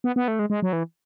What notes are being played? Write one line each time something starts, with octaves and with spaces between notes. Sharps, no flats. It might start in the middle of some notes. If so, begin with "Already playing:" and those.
B3
B3
A3
G#3
G#3
F#3
E3